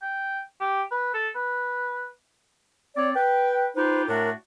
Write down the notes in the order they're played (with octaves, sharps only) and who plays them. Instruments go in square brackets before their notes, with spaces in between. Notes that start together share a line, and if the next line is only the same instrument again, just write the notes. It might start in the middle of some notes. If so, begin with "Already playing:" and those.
[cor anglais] G5
G4
B4
A4
B4
[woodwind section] C4 C#5 D5
B4 G5
D#4 F4 G4 B4 C5
A2 A3 D4 F#4 A#4